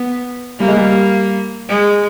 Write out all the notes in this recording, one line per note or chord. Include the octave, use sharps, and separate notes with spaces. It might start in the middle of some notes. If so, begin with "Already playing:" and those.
Already playing: B3
G3 A#3
G#3
G3
G#3